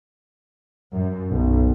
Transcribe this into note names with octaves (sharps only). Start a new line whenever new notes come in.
F#2
B1